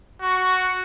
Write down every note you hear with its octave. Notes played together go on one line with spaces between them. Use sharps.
F#4 C#6